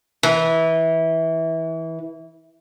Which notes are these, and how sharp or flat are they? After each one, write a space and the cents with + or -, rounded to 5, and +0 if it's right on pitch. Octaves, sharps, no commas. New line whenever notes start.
E3 -20